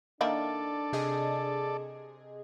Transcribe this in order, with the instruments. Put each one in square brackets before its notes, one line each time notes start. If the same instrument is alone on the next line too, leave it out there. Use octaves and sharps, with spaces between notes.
[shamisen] D#3 A#3 E4 [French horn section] D4 [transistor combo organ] A4 D5
[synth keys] C3 G#4 D#5